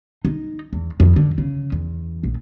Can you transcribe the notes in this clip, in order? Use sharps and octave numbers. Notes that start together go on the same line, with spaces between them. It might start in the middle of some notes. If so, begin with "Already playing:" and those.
D#4
E2
F2
D3
C#3
E2
A#1